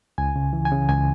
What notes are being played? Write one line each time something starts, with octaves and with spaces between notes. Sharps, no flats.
C#2 G#5
C#3
E3
G#5
C#3
C#2 G#5